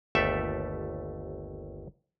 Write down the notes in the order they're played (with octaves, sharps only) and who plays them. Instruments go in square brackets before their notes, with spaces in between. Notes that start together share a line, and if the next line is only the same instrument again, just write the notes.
[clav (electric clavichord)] G1 D#2 A3 G4 A4 E5